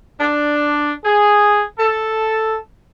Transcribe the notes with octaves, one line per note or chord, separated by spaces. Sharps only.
D4
G#4
A4